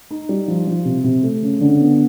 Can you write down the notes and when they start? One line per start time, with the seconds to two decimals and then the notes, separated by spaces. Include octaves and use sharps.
0.11 D#4
0.29 G3
0.48 F3
0.67 F3
0.85 C3
1.04 C3
1.23 A3
1.43 C#3
1.61 D3
1.80 B3